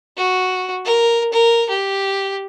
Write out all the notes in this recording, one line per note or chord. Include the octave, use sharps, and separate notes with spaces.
F#4
A#4
A#4
G4